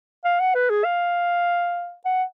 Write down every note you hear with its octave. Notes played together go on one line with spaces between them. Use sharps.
F5
F#5
B4
G#4
F5
F#5